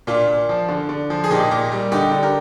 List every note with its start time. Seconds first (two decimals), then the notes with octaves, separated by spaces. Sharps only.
0.07 A#2 D4 F4
0.28 A#2
0.49 F3
0.69 D3
0.89 D3
1.10 F3
1.24 G#4
1.30 A#2 D#4 G4
1.51 A#2
1.72 G3
1.91 D3 D#4 G4
2.12 D3
2.23 G4 A#4